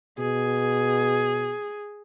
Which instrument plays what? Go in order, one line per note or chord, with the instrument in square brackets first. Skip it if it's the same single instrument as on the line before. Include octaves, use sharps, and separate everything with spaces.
[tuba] B2 [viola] G#4